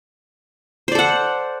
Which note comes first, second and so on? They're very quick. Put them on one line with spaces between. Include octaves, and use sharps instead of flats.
C5 D5 A4 F#5